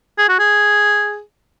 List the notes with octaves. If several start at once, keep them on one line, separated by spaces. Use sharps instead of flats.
G#4
F#4
G#4